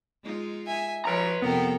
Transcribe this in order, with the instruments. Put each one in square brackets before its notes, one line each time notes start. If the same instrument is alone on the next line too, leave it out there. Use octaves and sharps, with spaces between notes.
[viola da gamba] G#3 D#4 F4
[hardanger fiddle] E5 G#5
[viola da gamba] F3 [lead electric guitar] B4 A#5 [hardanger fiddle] C#5
[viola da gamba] F2 C3 A4 [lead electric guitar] B3 [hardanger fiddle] A#4 G5